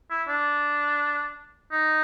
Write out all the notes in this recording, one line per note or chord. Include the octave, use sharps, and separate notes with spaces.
E4
D4
D#4